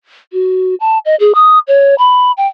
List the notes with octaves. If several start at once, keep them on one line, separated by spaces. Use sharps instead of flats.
F#4
A5
D#5
G#4
D#6
C#5
B5
G5